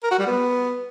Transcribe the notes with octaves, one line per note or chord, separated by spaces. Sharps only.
A#4
F#4
G3
B3